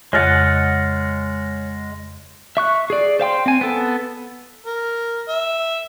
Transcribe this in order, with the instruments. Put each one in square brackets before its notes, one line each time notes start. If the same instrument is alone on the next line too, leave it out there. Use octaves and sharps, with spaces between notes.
[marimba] F2 C#3 [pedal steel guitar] G#3 D#5 F#5 [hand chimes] C#5 F6 A6
[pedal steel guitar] E5 C#6 F#6
G#4 D5
C5 F5 G5 C6
C4 G#5
B3 A4
[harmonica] A#4
E5